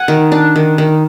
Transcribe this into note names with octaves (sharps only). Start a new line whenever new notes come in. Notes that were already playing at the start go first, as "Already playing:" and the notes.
Already playing: F#5 G#5
D#3
D4
D#3
D#3